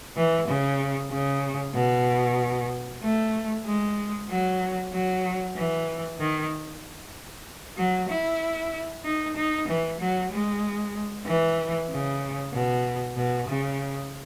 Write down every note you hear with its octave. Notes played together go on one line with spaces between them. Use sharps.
E3
C#3
C#3
B2
A3
G#3
F#3
F#3
E3
D#3
F#3
E4
D#4
D#4
E3
F#3
G#3
E3
C#3
B2
B2
C#3